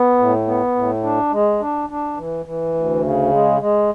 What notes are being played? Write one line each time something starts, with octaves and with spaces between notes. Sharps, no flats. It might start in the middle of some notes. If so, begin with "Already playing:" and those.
Already playing: B3
A2
B3
A2
D4
G#3
D4
D4
E3
E3
D2
C#3
G#3
G#3